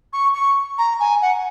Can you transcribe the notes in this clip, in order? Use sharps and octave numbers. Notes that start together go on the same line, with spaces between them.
C#6
C#6
A#5
G#5
F#5